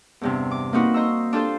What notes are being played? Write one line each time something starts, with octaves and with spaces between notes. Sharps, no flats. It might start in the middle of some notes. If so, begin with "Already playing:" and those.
E2 G2 C3
D6
A#3 C4 D#4 F#4 B4
C5 D#5 A#5 C#6 E6
D4 F4 G4 A4 C5